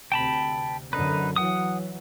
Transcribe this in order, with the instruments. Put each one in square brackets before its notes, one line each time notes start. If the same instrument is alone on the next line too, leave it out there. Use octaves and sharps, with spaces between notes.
[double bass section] D2 C3 [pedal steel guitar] G5 A5 B5
[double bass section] F#2 D3 [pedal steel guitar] D#4 B4
[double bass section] E3 F#3 [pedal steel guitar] F#5 D#6